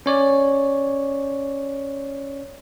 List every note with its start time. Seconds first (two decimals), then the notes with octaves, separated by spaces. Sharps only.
0.06 C#4 C#5 D5